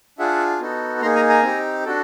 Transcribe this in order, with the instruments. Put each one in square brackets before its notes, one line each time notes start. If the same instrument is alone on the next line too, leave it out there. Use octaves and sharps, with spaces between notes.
[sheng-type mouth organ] D4 F4 G#4 E5 F#5
B3 D#4 F#4 A4
A#3 D#4 G#4 A#5 C6
G#5 A#5
G#5 A#5
C4 D#4 G4
D4 F#4 A4